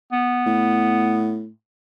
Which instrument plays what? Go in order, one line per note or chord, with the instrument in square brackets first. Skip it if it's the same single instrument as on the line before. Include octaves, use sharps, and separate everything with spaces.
[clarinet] B3
[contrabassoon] A2